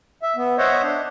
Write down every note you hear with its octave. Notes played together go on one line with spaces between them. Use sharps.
E5
B3
C5 C#5 D#5 E5 F#5
D4